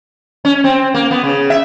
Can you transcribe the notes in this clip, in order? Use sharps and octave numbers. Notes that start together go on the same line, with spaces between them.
C#4
C4
A#3
B3
C#3
E5